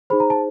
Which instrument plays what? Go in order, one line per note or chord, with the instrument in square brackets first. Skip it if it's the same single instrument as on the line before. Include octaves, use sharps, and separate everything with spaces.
[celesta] D#4 G#4 C5 B5
A#5
A5